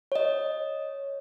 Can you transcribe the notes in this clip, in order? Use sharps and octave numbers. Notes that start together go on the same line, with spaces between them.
C#5 D#5